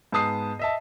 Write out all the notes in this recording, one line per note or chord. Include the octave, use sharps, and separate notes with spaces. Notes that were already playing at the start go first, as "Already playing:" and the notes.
G#2 B3 A5 D#6 C7
D#5 E5 A5